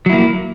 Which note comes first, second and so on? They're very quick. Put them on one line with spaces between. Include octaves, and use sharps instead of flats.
F#3 E4 A#3